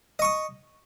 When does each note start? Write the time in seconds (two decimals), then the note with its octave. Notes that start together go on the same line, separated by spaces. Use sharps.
0.19 D#5
0.22 C#6
0.25 D#6